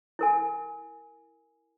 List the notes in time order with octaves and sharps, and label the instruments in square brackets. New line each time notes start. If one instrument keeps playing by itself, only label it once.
[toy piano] E4 A#4 G#5